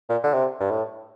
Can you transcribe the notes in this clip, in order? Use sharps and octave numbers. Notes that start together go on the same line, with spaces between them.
A#2
D3
C3
G2
A2